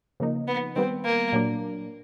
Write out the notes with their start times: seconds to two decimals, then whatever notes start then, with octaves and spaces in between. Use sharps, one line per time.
0.20 C#3 F3 A#3 D#4
0.48 B3
0.76 D#3 G3 B3 C4
1.05 A#3
1.32 A#2 F#3 A#3 D4